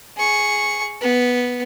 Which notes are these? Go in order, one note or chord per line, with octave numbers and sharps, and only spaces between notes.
G#4 C#6
B3